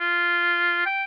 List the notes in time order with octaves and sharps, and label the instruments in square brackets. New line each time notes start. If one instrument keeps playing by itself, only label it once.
[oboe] F4
G5